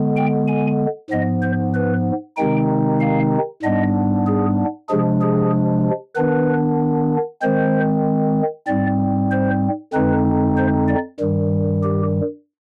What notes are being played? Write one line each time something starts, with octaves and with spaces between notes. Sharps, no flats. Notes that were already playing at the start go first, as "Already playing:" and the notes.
Already playing: D3 G#3 B3
G5
G#5
G#2 F3 B3 D#5
C5
B4
C3 D#3 G#3 C4 D#4 G5
F5
G#2 G3 B3 D4 D#5
G#4
C3 F3 G#3 D4 G#4
G#4
D#3 B3 D4 B4
D#3 G#3 C4 C5
G#2 G3 C4 D5
C5
F2 D3 G#3 C4 D#4 B4
C5
D5
G2 D#3 G3
G4